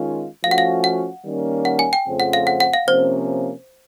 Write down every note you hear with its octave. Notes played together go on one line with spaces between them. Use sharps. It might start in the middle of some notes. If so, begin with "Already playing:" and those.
Already playing: D#3 G#3 C#4 F4
F3 A3 C#4 F#4 F5
F#5
F5
F#5
D#3 G3 A#3 C#4
F#5
G#5
G5
F2 C#3 F3 A3 C4
F#5
F5
F#5
F#5
F5
C3 F3 A#3 C#4 C5